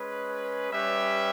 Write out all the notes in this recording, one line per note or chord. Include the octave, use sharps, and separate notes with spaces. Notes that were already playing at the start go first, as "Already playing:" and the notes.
Already playing: G#3 C#4 G#4 B4
G3 C#4 G4 B4 E5